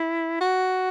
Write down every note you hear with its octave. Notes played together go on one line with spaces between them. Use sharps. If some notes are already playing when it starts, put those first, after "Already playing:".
Already playing: E4
F#4